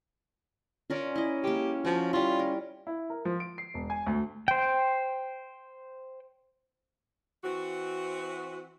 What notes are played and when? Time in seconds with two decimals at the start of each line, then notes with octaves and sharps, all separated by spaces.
0.90 C#4 F4 A#4 D5
1.16 E4 D#5
1.44 G#3 A#3 G4
1.85 F3 F#4
2.13 G3 E4 F4
2.39 A#4
2.87 E4
3.10 A#4
3.25 F3
3.40 D7
3.58 C7
3.74 E1
3.90 G#5
4.07 D2
4.48 C5 G5
7.43 E3 C4 F#4